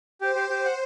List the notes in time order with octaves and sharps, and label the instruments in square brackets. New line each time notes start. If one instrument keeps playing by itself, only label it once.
[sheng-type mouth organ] G4 [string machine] C5
[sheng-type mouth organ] G4
G4
F#5